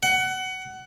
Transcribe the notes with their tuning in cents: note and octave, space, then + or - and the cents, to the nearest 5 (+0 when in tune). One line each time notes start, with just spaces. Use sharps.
F#5 +20